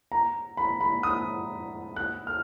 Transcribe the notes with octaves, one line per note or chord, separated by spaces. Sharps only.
A#5
B5
B5
D#6
F#6
F6